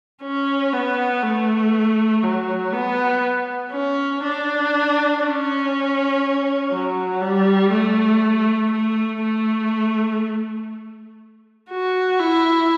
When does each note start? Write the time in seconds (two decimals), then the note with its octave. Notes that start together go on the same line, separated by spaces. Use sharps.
0.23 C#4
0.73 B3
1.23 A3
2.23 F#3
2.73 B3
3.72 C#4
4.23 D4
5.22 C#4
6.71 F#3
7.21 G3
7.72 A3
8.71 A3
9.22 A3
11.70 F#4
12.20 E4